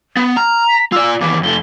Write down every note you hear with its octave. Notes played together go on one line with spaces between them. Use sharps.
B3
A#5 F6
B6
F4 D5 E6
D#2 E3 D6
F2 A3 G7